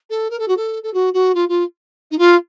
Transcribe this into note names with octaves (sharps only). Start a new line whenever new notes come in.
A4
A#4
A4
F#4
A4
A4
F#4
F#4
F4
F4
D#4
F4